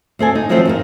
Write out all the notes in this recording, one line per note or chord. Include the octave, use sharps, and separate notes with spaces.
D2 C4 A4 G#5
D#4
D#3 F3 F#3 A3 C4 C5
F2 D#4 A#4